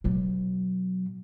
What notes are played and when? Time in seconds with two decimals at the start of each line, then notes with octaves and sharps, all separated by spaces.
0.04 B2 F#3